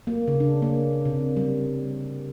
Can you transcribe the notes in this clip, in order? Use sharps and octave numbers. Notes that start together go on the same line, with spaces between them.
A#3
C#3
D4
A#3
C3
G3